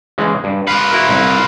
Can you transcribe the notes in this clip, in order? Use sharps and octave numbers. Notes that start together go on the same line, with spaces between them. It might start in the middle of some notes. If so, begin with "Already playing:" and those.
C#3 E3 G#3
G2
F4 B4 F5
E4 F#4 A#4
C2 E4